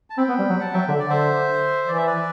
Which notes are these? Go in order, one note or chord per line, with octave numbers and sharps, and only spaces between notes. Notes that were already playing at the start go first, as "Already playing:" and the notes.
A5
C4 G5 B5
B3
G3
F#3
F#5 A5
F#3 E5 G5
D3 E5
D3 D5
C5 E5
E3 D5
E5
B4 D5